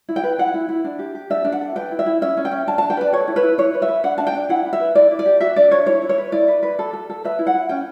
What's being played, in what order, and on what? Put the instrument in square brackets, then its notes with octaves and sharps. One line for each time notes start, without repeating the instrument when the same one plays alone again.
[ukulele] E4
G5
B4
E4 F#5
E4
E4
D4
G4
G4
D4 E5
D4
F#5
A4
B4 G5
E4
E5
E4
C#4 E5
C#4
G5
C#4
D4 A5
A5
D4
G5
B4 D5
A4 C#5
E4
B4
E4
E4 C#5
B4
E5
B4
D4 F#5
D4 A5
G5
D4
E4 F#5
E4
E5
B4
E4 D5
E4
D5
G4
F#4 E5
D4 D5
D4 C#5
E4 C#5
E4
C#5
B4
E4 D5
B4
B4
A4
A4
A4
B4 E5
E4
F#5
E4
C#4 G5